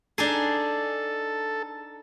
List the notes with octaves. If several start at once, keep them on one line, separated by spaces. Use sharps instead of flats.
D4 D#4 G#4 A4